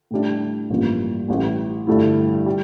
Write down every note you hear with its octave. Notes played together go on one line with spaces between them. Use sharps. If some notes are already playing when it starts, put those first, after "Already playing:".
A2 G3 D4
A1 G2 F3 A#3
A1 A2 G3
G2 D3 A3 E4
G3